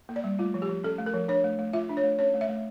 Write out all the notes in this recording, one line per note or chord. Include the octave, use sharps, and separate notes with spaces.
A#3
D5
G3
A3 F4
F3
G4
F3
C#4 A4
A3
A#4
F3
D4 C#5
A3
A3
F4 E5
D4
C#5
A3
C#4 C#5
A3
E5
A3